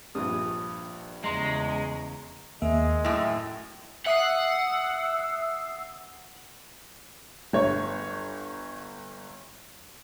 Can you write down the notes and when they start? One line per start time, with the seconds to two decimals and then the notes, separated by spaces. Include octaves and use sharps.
0.15 A#1 G2 D#6
1.24 E2 C#3 G#3 A#5 C6
2.62 D#2 G#3 A#3 E5
3.04 F#2 A2 E6 A#6
4.06 E5 F#5 D#6 E6 C7
7.53 G1 C#5